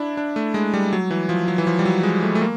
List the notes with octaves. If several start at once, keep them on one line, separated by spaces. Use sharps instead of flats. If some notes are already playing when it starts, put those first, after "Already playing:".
Already playing: D4 E4
D4
A3
G#3
G3
F#3
E3
F3
F#3
E3
F3
G3
F#3
G#3
A3
A3
A#3